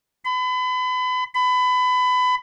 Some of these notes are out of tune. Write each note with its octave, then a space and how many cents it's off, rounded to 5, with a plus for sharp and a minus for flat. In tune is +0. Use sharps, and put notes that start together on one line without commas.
B5 +35
B5 +25